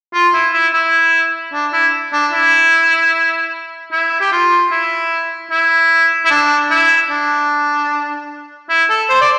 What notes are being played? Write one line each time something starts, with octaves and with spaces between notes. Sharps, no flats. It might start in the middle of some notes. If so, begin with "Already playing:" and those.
F4
E4
E4
E4
D4
E4
D4
E4
E4
G4
F4
E4
E4
E4
D4
E4
D4
E4
A4
C5
D5